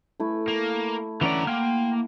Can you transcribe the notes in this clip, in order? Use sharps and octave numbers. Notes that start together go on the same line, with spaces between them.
A3 E4
A#3
D3 E3 C#4 D5 F#5 A#5
A#3 G5 C6 F6